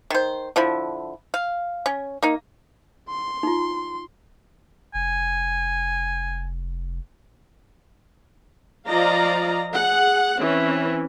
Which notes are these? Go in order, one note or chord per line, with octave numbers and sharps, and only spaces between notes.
D#3 C5
D3 F3 E4
F5
C#4
A#3 D#4
C6
D#4 F4
F1 G#5
F3 F4 D5 D#5 F5 A#5
G#4 F#5
E3 C4 C#4